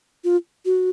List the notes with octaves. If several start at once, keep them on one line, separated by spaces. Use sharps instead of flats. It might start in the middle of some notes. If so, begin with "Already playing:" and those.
F4
F#4